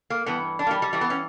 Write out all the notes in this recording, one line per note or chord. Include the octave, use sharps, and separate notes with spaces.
A#3
G2 E3 B3
D4
A#3
G3
G3
G2 E3 G3
B3
C#4